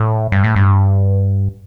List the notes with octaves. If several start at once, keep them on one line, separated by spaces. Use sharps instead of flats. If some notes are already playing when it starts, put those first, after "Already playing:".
Already playing: A2
G2
A2
G2